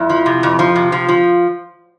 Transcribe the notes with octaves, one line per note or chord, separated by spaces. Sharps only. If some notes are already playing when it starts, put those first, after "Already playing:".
Already playing: F2 E4
F3
C3
F2
F3
C3
F3 F4
F3